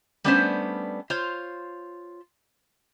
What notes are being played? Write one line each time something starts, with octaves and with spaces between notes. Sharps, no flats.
G3 A3 B3 C#4 D4 C5
F4 C5 C#5